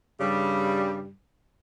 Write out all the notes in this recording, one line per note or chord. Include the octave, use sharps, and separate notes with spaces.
G2 C#3 G3